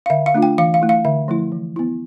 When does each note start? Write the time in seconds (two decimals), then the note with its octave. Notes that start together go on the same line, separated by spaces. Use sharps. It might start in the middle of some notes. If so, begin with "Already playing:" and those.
0.06 F5
0.10 D3 E5
0.26 F5
0.34 A3 D4 F4
0.42 G5
0.58 E3 F5
0.74 F5
0.82 A3 E4
0.89 F5
1.05 D3 E5
1.28 F3 A3 E4
1.52 E3
1.76 B3 E4